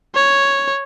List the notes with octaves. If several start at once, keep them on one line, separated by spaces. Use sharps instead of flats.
C#5